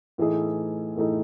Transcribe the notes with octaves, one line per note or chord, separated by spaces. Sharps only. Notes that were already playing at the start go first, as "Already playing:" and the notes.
A2 E3 A3 D#4 G#4
A2 E3 A3 D#4 G#4